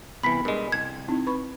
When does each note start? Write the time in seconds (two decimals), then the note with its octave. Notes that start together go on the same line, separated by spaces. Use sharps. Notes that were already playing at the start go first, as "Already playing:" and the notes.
0.23 C2 E3 B3 G#5 B5 B6
0.45 G2 G#3 A#4
0.72 C2 G#6
1.08 C4 D#4 E4
1.27 B4 B5 C#6